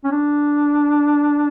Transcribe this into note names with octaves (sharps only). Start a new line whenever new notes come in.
C#4
D4